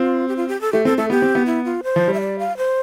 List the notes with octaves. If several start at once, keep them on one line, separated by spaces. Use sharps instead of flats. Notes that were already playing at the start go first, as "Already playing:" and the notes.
Already playing: C4 F4
G4
F4
G4
A4
A3 G4
C4 A4
A3 A4
B3 G4
C4
B3
E4
F4
C5
F3
G3
E5
D5
F5
C5